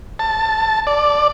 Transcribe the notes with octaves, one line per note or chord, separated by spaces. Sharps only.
A5
D5